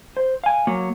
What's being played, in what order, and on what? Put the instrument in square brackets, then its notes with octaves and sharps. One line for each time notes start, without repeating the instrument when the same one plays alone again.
[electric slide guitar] C5
F5 G#5
F#3 A#3